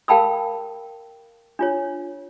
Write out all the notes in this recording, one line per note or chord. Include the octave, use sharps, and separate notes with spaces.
A#4 F5 G5 A5 B5 E6
D4 F4 C#5